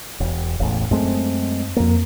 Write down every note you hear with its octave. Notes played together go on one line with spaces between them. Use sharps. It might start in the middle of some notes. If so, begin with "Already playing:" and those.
E1
E1 A1
F#2 G#3 A3 C4
F2 A#3